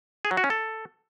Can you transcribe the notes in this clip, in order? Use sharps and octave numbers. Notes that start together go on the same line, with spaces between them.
G#4
F#3
F#4
C#4
A4